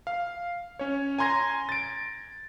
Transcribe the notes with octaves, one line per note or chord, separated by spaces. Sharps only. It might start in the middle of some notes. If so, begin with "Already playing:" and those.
F5
C#4 C#5
G#5 A#5 C6 G#6 A#6
A6 D7